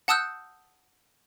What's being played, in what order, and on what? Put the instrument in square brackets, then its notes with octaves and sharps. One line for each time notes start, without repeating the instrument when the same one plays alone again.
[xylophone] F#5 A5 D#6 E6 F#6 G6